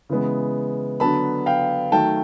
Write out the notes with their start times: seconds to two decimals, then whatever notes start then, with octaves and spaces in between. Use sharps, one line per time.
0.09 C#3 E3 G#3 B3
1.00 D3 F#3 B3 A5 B5
1.46 F5 G5
1.92 D#3 F#3 A3 G5 A5